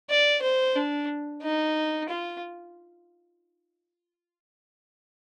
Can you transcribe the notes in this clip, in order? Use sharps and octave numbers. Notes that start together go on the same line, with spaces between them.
D5
C5
D4
D#4
F4